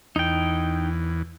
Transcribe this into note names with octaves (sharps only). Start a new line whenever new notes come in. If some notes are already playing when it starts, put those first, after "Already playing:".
E2 D#4 G5